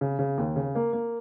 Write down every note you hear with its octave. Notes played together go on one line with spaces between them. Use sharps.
C#3
C#3
D#2
C#3
A#3
A#3